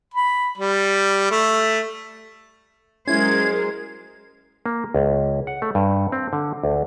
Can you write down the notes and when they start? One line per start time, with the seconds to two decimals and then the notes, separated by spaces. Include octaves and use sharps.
0.14 B5
0.58 G3
1.31 A3
3.07 F#3 G#3 C#4 E4 A#4 C5 G#6
4.66 A#3
4.94 C#2
5.47 F#5
5.62 A3
5.75 G2
6.12 C4
6.33 D3
6.64 D2